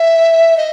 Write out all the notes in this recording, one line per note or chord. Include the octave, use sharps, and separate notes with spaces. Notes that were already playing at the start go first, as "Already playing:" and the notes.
Already playing: E5
D#5